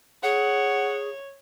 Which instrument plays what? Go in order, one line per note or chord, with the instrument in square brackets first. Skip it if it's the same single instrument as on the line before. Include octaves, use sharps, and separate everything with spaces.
[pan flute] G#4 [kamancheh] C#5 [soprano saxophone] F#5